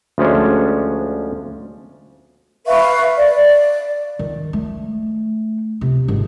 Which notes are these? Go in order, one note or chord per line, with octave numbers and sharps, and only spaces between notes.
D2 F3 G#3 C#4 D4
B4 E5 F5 C#6
D5
D#3
A3
C3
G#1 D3